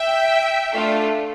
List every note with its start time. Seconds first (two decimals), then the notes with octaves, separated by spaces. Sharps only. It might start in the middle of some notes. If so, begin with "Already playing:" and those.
Already playing: E5 G5
0.71 A3 D4 F4 A4